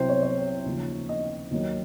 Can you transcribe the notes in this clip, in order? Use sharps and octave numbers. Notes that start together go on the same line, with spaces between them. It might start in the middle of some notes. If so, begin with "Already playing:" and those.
Already playing: C2 C3 F#3 C5
C#5
C#5
D#2 C#3 F3
D#5
D#2 D#3 F#3